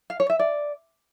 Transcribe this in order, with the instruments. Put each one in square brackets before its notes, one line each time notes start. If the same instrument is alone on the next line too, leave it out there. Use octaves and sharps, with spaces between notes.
[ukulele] F5
C#5
E5
D5